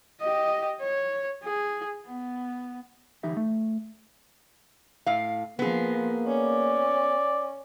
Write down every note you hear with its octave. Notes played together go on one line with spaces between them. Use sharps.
G4 D#5
C#5
G#4
B3
D2 E3 D#4 G4 E5
A3
A2 F5
F3 A#3 B3 G#4
C#4 D5